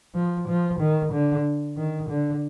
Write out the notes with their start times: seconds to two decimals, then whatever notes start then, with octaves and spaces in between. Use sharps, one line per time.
0.15 F3
0.48 F3
0.80 D#3
1.13 D3
1.77 D#3
2.10 D3